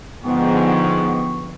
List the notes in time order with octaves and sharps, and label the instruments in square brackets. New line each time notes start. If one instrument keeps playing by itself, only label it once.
[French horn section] G#2 [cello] D3 F3 [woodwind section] B3 [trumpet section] G5 C#6